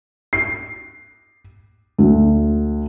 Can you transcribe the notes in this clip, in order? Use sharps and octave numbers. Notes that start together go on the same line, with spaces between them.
C7
D2